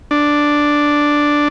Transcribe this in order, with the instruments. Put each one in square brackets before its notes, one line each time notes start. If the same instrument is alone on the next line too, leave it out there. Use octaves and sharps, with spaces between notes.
[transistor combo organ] D4